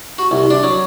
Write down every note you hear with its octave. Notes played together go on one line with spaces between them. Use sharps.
F#4
C2
D4
F#3